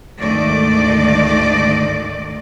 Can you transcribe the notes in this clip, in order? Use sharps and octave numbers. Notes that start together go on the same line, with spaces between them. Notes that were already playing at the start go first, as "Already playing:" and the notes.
D2 G#2 D#3 A3 D5 D#5